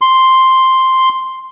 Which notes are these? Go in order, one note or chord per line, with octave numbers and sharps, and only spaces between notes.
C6